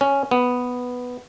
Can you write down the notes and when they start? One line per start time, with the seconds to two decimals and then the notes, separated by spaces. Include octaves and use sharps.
0.01 C#4
0.31 B3